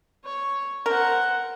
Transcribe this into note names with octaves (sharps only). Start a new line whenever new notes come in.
C#5
A#4 C5 F#5